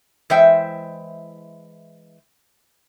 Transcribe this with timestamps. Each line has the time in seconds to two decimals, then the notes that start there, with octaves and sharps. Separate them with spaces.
0.30 E3 G#3 C5 E5 G5